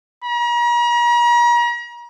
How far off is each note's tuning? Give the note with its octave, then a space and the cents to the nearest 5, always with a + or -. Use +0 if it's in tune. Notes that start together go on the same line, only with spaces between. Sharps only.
A#5 +40